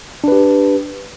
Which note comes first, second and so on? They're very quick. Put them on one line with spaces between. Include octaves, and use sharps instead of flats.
D4 B4 G4